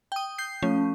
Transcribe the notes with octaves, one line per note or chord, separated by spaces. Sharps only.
G5 D#6
G6 C7
F3 A3 C#4